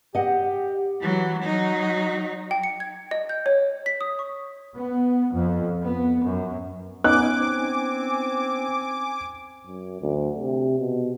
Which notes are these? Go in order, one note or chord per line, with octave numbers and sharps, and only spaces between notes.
G4 D#5 F#5
E3 F#3
F#3 D#4
G5
C#7
G#6
D#5
G6
C#5
B6
D#6
C#6
B3
F2
B3
F#2
B3 C#4 D#4 G#5 D6 F#6
C4
F#2
D2
C3
B2